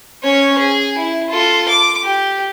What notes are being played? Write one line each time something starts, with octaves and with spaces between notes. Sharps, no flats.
C#4 C#5
G#4
E4
F4 A4
D6
G4